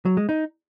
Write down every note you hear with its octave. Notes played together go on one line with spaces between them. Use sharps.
F#3
G#3
D#4